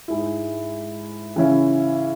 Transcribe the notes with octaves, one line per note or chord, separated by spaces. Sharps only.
G#2 G#3 E4
C#3 E3 C#4 E4